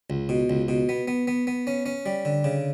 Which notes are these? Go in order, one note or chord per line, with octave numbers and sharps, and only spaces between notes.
C#2
B2
C#2
B2
B3
B3
B3
B3
C#4
C#4
G3
D3
C#3